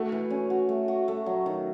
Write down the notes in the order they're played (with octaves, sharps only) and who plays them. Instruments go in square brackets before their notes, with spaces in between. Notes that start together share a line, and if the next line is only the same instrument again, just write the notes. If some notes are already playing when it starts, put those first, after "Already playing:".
Already playing: [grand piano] A3 [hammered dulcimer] F#4
[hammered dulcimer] E3
C#4
F#4
A3
F#4
A3
F#3
D#3